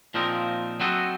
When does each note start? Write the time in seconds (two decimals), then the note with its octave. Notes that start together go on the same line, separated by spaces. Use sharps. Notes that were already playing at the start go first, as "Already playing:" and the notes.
0.14 A#2 F3 C4 D#4 A#4
0.80 F#3 C4 F#4 A4 D#5